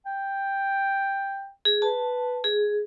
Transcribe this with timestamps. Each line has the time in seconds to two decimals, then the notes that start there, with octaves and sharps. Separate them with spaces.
0.06 G5
1.65 G#4
1.82 B4 A5
2.44 G#4